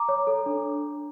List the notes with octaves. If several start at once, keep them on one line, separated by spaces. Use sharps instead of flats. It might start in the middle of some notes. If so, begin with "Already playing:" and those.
Already playing: A#5 D6
C#5
A4
D4